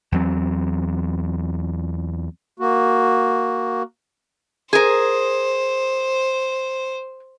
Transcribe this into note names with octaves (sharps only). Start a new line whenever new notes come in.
E2 F#3 C4
A#3 F#4
G#4 A#4 C5